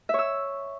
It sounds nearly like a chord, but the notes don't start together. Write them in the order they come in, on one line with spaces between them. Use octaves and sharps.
E5 C#5 E6